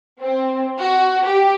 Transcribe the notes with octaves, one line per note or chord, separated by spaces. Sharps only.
C4
F#4
G4